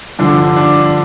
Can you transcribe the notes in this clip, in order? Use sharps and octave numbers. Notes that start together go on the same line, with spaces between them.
G2 D3 F3 D4
D4